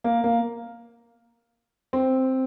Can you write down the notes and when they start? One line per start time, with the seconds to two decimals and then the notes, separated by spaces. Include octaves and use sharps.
0.04 A#3
0.24 A#3
1.93 C4